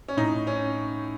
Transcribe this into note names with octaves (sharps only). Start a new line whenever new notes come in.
C#4
A2 D#4
C#4